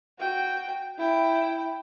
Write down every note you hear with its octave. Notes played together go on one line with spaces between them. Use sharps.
F#4 G5
E4 G5